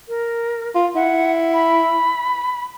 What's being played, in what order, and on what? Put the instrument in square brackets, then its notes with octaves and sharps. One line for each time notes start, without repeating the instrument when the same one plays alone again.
[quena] A#4
[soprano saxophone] F4
[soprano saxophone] E4 [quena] F#5
[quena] B5